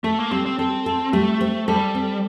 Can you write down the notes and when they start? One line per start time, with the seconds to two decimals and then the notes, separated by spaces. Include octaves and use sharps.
0.04 A3 A4
0.18 A#3
0.31 G3 C4
0.46 C4
0.59 C4 A4
0.86 A4
1.13 G3 A3
1.41 C4
1.68 G3 A4
1.95 C4